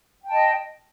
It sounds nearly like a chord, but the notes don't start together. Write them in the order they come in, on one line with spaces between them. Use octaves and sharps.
G5 A5 D#5